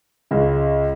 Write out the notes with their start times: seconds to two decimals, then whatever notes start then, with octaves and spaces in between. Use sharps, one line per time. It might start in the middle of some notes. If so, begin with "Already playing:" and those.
0.31 C#2 C#3